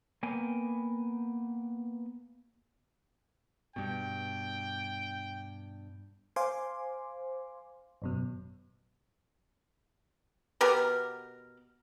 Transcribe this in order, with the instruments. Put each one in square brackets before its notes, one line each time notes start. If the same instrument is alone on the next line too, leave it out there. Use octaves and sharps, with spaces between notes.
[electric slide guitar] A#3 B3 G5 G#5
[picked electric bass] G2 B2 [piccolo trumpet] G5
[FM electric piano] C5 F5 G#5 C6 D6
G#1 F#2 B2
[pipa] B2 B3 G4 A#4